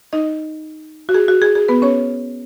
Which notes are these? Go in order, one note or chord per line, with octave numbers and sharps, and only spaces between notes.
D#4 D#5
F#4
G#4
F#4
G#4
G#4
B3 B4
C#4 C#5